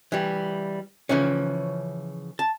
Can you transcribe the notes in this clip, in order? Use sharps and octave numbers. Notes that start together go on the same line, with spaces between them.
E3 G3
C#3 E3 F3 C#4
A5